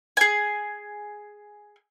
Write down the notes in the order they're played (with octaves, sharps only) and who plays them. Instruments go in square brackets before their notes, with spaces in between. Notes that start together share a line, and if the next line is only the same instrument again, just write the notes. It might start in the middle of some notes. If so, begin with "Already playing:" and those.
[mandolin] G#4 G#5